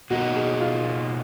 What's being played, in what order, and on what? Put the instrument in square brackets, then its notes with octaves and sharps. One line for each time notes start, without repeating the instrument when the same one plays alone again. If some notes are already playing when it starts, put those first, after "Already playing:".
[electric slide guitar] B2 A#3 D#4 [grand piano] F#4
[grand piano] G#4
F4